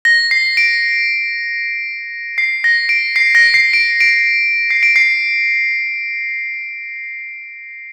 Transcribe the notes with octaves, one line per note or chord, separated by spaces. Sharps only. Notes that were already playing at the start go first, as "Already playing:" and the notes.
A#6
C7
D7
C7
A#6
D7
C7
A#6
C7
D7
D7
C7
D7
C7